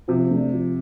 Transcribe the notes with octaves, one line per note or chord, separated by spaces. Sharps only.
C3 F3
A3 D4
F3